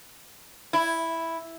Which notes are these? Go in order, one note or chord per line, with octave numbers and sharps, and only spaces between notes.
E4